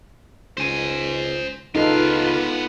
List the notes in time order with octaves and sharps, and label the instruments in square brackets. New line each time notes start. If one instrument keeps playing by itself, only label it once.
[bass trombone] C#2 [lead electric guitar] C5 G#5
[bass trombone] C#2 [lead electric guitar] B3 F5 [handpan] D#4 A4 [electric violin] F4 B4